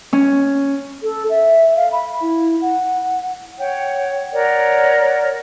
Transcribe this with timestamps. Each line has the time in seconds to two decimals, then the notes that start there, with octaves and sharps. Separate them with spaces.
0.13 C#4
1.03 A4
1.30 E5
1.76 F5
1.92 B5
2.21 E4
2.61 F#5
3.58 C#5 F#5 G5
4.33 A#4 C#5 D5 F#5